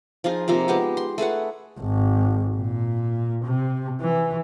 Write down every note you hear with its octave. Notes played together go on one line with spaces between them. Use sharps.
F3 D#4 F4 G#4
C3 F3 A#3
G#3 B3 G4
C6
A3 G#4 B4 F#5
G#1
A#2
C3
E3